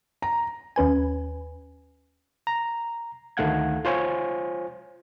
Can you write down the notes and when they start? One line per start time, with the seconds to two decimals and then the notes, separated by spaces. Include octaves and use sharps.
0.22 A#5
0.76 D#2 C#4 B4 G#5
2.47 A#5
3.37 D2 D#3 A3 F5 F#5 G#6
3.85 F4 C5 C#5 G#5